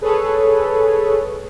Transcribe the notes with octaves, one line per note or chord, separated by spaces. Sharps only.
G#4 A4 B4 C#5